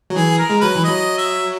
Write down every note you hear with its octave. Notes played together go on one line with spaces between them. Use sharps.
F#3
E3 G#4
A#4
G#3
F#3 B4
E3
F#3 D#5
E5